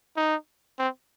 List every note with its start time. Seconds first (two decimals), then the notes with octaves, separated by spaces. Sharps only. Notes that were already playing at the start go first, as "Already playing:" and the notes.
0.17 D#4
0.79 C4